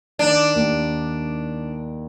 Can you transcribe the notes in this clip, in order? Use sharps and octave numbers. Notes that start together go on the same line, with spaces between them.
D#3 D4
D#2